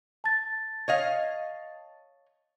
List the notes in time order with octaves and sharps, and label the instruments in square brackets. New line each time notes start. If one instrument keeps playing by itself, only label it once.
[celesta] A5 A6
[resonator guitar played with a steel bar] C#5 D#5 F5